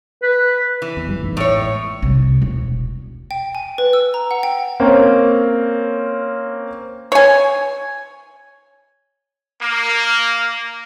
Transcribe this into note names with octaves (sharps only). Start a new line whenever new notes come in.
B4
E3
E2
F#1 F#2 G3
A1 E2 G#2
A2 C#5
C2
E1
G5
G#5
B4
E6
A#5
F#5
G5
A#3 C4 C#4
C#5 G#5
A#3